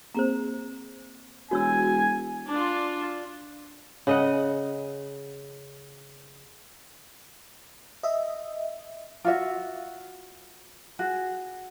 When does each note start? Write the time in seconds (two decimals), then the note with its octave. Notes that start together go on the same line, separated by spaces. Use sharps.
0.14 A#3 C4 G#4 C5 A#5
1.51 E1 F#4 C#5 G#5 E6
2.50 D4 F4
4.07 C#3 D#5 F#5
8.03 D#5 E5
9.25 F4 F#4 E5
10.99 F#4 G#4